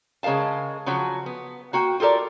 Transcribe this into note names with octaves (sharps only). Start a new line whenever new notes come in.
C#3 G#3 A#4 F5 A5
C#3 F3 F#3 F#4
B3
A#3 F#4 F#5 G5
F4 G4 A4 A#4 D5